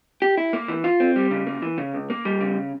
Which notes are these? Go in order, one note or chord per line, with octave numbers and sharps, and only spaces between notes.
G4
E4
A#3
E3
F4
C4
G3
C#3
A#3
E3
C#3
C#2
A#3
G3
C#3